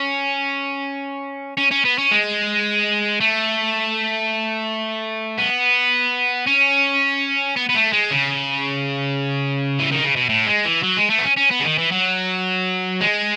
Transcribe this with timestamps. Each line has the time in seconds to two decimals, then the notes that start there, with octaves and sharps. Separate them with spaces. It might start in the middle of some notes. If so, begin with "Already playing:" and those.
Already playing: C#4
1.57 C#4
1.71 C#4
1.85 B3
1.98 C#4
2.11 G#3
3.21 A3
5.38 B3
6.47 C#4
7.56 B3
7.69 B3
7.75 A3
7.92 G#3
8.11 C#3
9.79 E3
9.92 D#3
10.04 C#3
10.16 B2
10.29 A2
10.47 G#3
10.65 E3
10.83 F#3
10.97 G#3
11.10 A3
11.19 B3
11.24 C#4
11.37 C#4
11.51 B3
11.60 C#3
11.64 D#3
11.78 E3
11.92 F#3
13.01 G#3